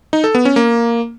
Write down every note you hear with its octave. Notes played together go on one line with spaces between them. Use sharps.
D#4
A4
B3
C#4
A#3